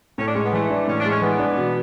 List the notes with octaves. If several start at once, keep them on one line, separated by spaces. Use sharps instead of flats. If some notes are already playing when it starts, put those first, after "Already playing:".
A2 C#4
D4
G#3 C#4
B3
E3 A3
D4
A2 C#4
D4
G#3 C#4
E3 B3
D4
B2